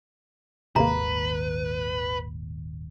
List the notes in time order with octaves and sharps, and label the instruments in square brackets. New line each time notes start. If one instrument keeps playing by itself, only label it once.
[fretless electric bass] D#1 G#1 D#2 [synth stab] C3 G#3 A#3 [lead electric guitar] B4 [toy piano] A#5